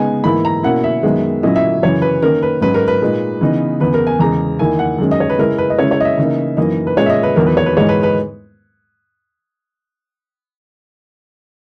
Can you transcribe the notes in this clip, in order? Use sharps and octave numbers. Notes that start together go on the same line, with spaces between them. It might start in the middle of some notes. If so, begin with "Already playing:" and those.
Already playing: C#3 G#3 B3 D#4 G#5
G#2 E3 A#3 E4 B5
A#5
B2 A#3 C#4 E4 F#5
E5
F#2 D#3 G#3 B3
A#2 F#3 C#4 E4 D#5
E5
F#2 C#3 E3 C#5
B4
D#3 A#3 C#4 A#4
B4
G#2 F#3 C#4 B4
A#4
B4
A#2 G#3 D#4
C#3 E3 B3 D#4
E2 C#3 E3 B3 B4
A#4
G#5
E2 C#3 G#3 A#5
E2 D#3 A#3 E4 G#5
F#5
F#2 D#3 G#3 C#4
D#5
C#5
B4
C#3 G#3 C#4 E4 A#4
B4
D#5
C#3 G#3 C#4 E4 C#5
C#5
D#5
E5
C#3 E3 A#3 D#4
F#2 E3 A#3 D#4 D#5
B4
A#2 G#3 C#4 C#5
E5
D#5
B4
E2 D#3 F#3 B3 A#4
B4
C#5
B4
G#2 E3 G#3 D#4 C#5
B4
B4